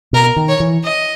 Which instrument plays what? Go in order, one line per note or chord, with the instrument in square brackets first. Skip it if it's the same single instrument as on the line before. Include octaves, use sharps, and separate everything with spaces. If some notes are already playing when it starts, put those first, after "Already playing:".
[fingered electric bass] B2 [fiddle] A#4
[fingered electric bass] D#3
[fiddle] C#5
[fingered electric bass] E3
[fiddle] D#5